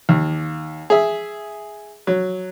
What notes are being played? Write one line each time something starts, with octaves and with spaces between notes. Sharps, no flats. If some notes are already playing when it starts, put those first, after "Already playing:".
D#2
G#4 E5
F#3